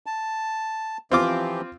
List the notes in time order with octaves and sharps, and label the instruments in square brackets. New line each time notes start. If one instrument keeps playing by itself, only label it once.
[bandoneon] A5
[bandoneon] E3 F3 G4 [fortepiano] C4 F4 D6